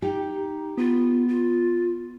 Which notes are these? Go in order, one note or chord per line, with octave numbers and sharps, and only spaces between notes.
D#4 G4
B3 F4
F4